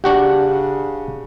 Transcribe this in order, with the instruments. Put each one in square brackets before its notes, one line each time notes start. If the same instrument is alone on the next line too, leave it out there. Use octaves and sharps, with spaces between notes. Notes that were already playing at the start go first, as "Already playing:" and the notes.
[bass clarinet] C#3 [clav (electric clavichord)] D4 F#4 G5 [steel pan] G4 F#5